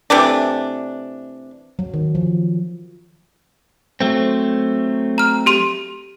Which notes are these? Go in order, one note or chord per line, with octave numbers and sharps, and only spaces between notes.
C3 E3 A3 D4
F#3
D#3
F3
F#3 A3 C4
A#5 F6
G4 C6 D#7